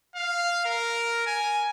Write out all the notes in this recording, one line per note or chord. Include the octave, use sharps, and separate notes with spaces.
F5
A#4
G#5